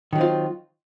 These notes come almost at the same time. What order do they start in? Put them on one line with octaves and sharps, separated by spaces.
D#3 F#3 C4 F4